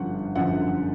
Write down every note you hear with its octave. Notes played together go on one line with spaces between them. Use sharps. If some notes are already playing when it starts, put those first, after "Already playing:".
Already playing: G1 F#2 D3 F3 F#5
G1 F#2 D3 F3 F#5